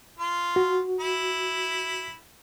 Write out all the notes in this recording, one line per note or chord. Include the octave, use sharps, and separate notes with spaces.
F4
F#4
E4